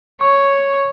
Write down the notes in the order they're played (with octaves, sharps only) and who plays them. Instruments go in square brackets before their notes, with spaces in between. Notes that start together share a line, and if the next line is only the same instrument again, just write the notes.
[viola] C#5 [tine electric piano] C#6